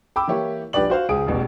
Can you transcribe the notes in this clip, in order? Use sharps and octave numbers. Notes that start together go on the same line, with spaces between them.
G5 B5 D6 E6
E3 A#3 E4 G4 C#5
A#1 D4 G4 B4 D5 F#7
F#4 C5 F5
C#2 G#4 D#6 D7
E1 A1 B2